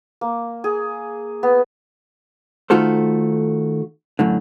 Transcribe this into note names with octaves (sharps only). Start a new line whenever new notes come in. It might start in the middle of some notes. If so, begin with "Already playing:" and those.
A#3
G#4
B3
D#3 A3 F4 F#4 A4 C5
F#2 A2 D3